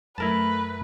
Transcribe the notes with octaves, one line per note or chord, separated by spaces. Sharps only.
F#2 A3 E4 A#4 B4 A5